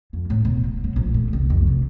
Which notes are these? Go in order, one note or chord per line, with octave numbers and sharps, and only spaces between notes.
F2
A2
E1
F#3
F#3
A#1
A3
C2
F2
C3